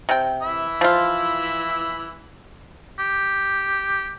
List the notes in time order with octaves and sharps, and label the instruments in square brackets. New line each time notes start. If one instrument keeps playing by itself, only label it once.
[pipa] C3 G5
[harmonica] E3 E5 B5
[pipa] F3 F4
[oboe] G4